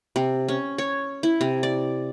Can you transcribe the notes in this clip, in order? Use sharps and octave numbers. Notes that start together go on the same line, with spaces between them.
C3
C#4
C#5
E4
C3
D5